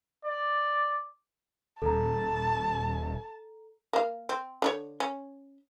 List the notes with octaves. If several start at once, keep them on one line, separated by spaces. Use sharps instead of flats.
D5
D#1 A4 A5 A#5
A#3 F5
C4
D3 D4 C#5
C#4